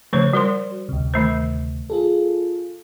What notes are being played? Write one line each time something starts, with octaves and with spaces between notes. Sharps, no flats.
C#3 F3 A3 C5 C#5
G3 F#4 A#4 C5 C6
D2 C3
D#3 A3 C5
F4 G#4 A4